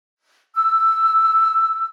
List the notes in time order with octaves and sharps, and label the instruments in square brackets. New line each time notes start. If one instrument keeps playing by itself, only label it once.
[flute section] E6